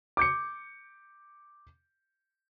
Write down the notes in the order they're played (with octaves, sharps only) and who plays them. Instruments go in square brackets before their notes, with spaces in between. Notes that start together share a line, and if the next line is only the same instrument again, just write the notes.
[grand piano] D6 G6 C#7